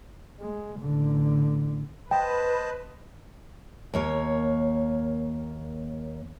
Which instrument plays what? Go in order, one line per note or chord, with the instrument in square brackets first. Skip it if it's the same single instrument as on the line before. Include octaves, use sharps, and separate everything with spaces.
[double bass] G#3
A1 D3
[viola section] B4 [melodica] C5 D#5 A5 [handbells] G5
[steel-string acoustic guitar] D#2 A#3 C#5